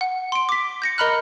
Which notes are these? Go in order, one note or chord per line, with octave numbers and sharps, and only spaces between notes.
F#5
C6 D7
D6 B6
G6 A#6 C#7
A#4 D#5 A#5 B5 F6 F#6